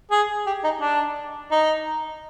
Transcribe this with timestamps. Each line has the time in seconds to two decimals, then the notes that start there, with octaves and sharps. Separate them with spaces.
0.11 G#4
0.46 G4
0.64 D#4
0.81 D4
1.51 D#4